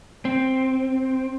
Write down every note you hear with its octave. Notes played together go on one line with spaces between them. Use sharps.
C4